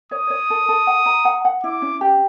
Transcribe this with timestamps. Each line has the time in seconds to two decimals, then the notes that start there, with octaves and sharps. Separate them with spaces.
0.11 C#5 D#6
0.30 C#5
0.50 A4
0.69 A4
0.87 F#5
1.06 A#5
1.25 F#5
1.45 F#5
1.64 E4 D6
1.82 C#4
2.01 G4